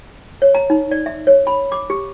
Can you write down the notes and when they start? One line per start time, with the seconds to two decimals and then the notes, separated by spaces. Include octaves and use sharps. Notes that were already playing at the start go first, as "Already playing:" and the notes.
0.42 C#5
0.55 A#5
0.70 D#4
0.91 D5
1.06 E5
1.27 C#5
1.47 B5
1.72 D6
1.90 G4